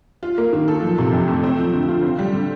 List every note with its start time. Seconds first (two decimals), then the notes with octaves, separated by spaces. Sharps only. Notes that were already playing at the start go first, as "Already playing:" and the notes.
0.23 F4
0.38 A#3
0.53 D#3
0.68 A4
0.82 F3
0.98 C3
1.13 F2
1.28 A3
1.44 C4
1.59 F3
1.73 D3
1.89 F4
2.03 C4
2.19 G3
2.33 D3